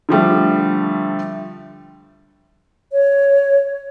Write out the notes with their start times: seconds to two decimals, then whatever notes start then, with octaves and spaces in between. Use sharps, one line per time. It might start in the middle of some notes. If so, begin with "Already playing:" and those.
0.09 D3 F3 G3 A3
2.92 C#5